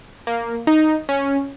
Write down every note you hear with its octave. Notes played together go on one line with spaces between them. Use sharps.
A#3
D#4
C#4